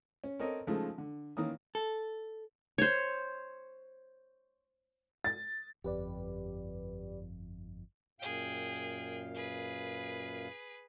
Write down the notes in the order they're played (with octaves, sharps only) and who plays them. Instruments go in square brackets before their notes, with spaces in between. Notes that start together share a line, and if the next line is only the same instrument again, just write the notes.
[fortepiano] C#4
C4 A4 A#4 C#5 D#5
C#3 F3 G#3 A3 D#4
D3
D#3 E3 A#3 C#4 D#6
[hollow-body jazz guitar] A4
[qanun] C5 C#5
[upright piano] A6
[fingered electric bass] G1 F2 [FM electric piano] G4 B4 D5
[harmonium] F#2 A#2 F5 [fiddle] G#4 G5
[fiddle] G#4 B4